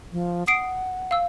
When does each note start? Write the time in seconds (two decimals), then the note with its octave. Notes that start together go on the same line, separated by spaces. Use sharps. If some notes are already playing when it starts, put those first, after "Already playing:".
0.13 F3
0.47 F#5 D#6 C7 D7
1.11 F5 E6